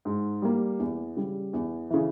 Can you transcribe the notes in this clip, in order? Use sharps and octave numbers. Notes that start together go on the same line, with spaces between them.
G#2
G3 A#3
E2
C#3 G3
E2
C#3 E3